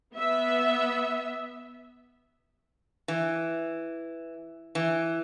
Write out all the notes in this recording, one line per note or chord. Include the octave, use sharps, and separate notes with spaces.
B3 E5
E3
E3